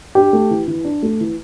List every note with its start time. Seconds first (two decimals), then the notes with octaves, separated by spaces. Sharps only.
0.15 D4 G4
0.33 A3
0.51 E3
0.68 E3
0.85 D4
1.03 A3
1.21 E3